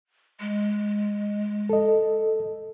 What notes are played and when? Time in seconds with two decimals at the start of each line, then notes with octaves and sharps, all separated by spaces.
0.40 G#3
1.69 A4 D#5